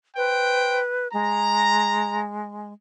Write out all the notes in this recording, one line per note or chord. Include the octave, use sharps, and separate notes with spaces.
B4 C5 G5
G#3 A#5